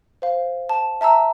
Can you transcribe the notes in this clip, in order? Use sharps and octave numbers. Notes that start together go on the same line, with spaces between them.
C5 F5
A5
E5 A5 A#5 E6